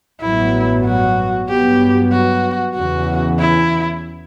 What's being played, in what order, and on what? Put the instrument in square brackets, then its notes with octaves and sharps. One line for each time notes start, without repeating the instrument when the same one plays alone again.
[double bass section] A1 G2 F#3 B3 [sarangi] E4
[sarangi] F#4
[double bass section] G2 F#3 B3 [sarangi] G4
[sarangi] F#4
[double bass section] E2 C#3 E3 [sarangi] F#4
[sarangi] E4